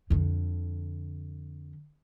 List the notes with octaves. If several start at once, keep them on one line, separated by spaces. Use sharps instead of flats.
F2 D3